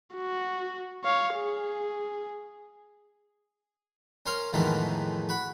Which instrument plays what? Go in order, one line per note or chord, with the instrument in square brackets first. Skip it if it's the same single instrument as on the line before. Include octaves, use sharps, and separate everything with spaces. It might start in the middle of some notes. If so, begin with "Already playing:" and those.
[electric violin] F#4
C#5 F5
G#4
[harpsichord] C#4 A#4 C5 F5
F2 A2 D#3 E3 G#3 B3
F#4 B5